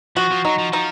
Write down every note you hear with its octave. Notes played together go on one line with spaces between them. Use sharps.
F3 F#4
F3
F#3 D#4
F3
F3 D#4